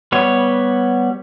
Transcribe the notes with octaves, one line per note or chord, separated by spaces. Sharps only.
G3 B3 C#5